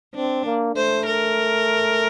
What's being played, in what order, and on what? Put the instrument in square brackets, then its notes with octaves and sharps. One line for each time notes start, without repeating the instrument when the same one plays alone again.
[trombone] C4 [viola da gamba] D4
[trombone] A#3
[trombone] A3 [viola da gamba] C5
[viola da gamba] A#4